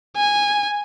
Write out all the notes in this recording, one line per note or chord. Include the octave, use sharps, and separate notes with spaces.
G#5